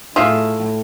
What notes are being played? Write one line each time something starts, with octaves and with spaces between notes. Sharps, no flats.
A2 F4 G#4 E5